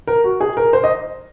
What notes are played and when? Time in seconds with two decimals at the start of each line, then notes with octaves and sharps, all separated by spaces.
0.07 A#4
0.24 F#4
0.41 G#4
0.57 A#4
0.73 C5
0.84 D#5